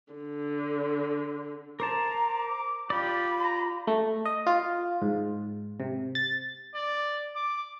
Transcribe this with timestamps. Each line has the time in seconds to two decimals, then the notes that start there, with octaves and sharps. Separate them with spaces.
0.13 D3
1.80 A#4 C5 A5 A#5 D6
2.90 F4 G4 D5 B5
3.44 A#5
3.87 A3
4.25 D#5
4.47 F4
5.02 G#2
5.80 C3
6.15 A6
6.75 D5
7.36 D6